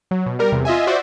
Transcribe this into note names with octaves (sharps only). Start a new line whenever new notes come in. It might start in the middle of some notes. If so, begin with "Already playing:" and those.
F#3
B2
G3 A#4
E2 C3
F4 D#5 E5 G#5
F#4 C5 D5 E5